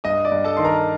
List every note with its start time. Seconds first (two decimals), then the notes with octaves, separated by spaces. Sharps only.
0.04 G2 D#5 D#6
0.25 D5 D6
0.32 G2
0.44 A4 A5
0.57 D#3 C6
0.64 A#4 A#5